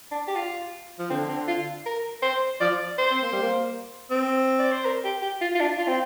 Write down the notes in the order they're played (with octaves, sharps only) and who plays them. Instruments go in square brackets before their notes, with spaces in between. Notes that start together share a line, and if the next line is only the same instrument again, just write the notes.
[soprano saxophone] D4
G4
F4
[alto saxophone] F3
[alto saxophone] D3 [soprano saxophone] C4
[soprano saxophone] C4
F4
A#4
C5
[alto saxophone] F3 [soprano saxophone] D5
[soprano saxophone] C5
[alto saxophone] C4
A#3
G3
A#3
C4
[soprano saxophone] D5
C5
A#4
G4
G4
F4
F4
D4
F4
C4